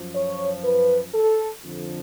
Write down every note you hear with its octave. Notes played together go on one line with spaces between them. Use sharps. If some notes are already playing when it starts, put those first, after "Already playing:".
Already playing: F#2 F3
C#5
B4
A4
F2 D3 F3